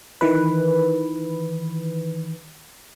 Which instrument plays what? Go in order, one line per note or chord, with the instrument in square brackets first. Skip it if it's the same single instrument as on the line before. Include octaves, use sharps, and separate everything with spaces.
[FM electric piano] D#3 E3 B4